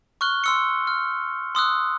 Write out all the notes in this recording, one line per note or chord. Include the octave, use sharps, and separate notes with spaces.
C#6 F6 F#6 G7
C6 E6 C#7
F6
C6 D#6 E6 F#6